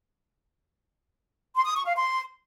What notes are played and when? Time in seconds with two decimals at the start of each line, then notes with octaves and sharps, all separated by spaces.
1.55 C6
1.65 D#6
1.75 C#6
1.85 F5
1.95 C6